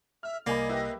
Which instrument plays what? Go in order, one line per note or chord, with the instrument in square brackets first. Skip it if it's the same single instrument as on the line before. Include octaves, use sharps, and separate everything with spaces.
[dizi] E5 [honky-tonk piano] F6
[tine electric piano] C2 [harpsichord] A#3 [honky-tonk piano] D5 G#5 B5 [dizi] D#5
[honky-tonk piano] E4 G4 B4